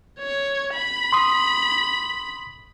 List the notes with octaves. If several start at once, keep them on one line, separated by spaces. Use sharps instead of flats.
C#5
B5
C6 D#6